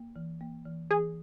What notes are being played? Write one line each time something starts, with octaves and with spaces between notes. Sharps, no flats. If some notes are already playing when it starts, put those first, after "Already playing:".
Already playing: A#3
E3
A#3
E3
E3 G#4